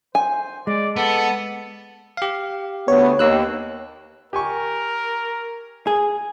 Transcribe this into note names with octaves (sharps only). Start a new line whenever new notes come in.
C5 G#5
G#3 D5
B3 A4
G4 F5
D2 B3 C#5
D#2 A#3 E6 F#6
G4 A#4 G#5 C#6
G#4